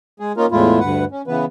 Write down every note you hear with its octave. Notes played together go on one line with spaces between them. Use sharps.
G#3 G#4
A#3 C#4 D#4 F4 A#4
E2 A2 G#3 A3 E4 F4
D2 G2 B4 F#5
C#4
C#3 E3 B3 B4